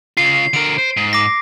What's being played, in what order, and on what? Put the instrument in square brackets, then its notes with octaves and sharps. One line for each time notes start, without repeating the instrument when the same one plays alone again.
[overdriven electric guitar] C#3 F4 [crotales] C7
[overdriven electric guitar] D3 A#4 [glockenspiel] D7
[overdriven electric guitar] C5
G#2
[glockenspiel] D6 A#6